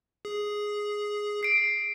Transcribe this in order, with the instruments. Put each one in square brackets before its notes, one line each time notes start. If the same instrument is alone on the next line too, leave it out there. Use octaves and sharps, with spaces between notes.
[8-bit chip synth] G#4
[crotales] C7 D7